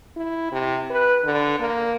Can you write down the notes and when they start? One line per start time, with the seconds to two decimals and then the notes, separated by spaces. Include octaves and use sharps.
0.16 E4
0.52 C3
0.91 B4
1.24 D3
1.60 A#3